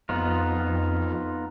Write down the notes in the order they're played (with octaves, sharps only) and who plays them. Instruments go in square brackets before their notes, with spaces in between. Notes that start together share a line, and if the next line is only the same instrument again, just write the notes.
[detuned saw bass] F2 [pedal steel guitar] B3 D#4 F4